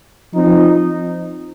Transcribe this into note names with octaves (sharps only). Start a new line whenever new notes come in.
F3 C4 D#4